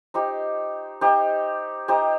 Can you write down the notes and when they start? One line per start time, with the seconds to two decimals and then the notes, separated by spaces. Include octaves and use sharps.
0.14 D#4 G4 C5
1.01 D#4 G4 C5
1.88 D#4 G4 C5